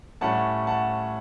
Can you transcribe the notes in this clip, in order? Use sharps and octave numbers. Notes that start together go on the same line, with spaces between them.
A2 G3 C#4 F#5 A5
F#5 A5